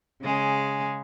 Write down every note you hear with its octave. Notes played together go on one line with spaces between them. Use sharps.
C#3 G#3